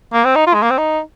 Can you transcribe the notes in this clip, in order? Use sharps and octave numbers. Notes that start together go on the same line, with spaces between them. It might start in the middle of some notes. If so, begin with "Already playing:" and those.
A#3
C4
D#4
F4
G#3
A#3
C4
D#4